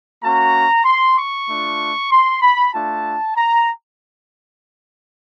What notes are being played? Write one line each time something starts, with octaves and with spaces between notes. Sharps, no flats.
A#3 C#4 F#4 A#5
C6
C#6
A3 D4 F4
C6
B5
A3 D4 F4 A5
A#5